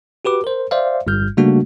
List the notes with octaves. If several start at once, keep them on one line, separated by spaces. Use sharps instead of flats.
F#4 G4 B4 D6
A#4 C5
C5 D5 E5 F5
G1 G2 G3 F6 G6
C#3 G3 A3 A#3 D4 F#4